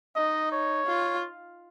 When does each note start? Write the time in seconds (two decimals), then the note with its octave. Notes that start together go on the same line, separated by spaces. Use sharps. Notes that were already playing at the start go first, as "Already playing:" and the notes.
0.16 D#4 D#5
0.52 C#5
0.86 F4